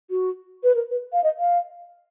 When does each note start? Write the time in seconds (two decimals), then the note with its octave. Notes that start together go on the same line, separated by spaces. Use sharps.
0.10 F#4
0.63 B4
0.75 A#4
0.91 B4
1.13 F5
1.24 D#5
1.39 F5